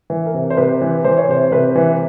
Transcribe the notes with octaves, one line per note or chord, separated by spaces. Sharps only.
E3
A#4
C3
C5
C3 B4
E3
E3 C5
C#5
C3 C5
C3 B4
E3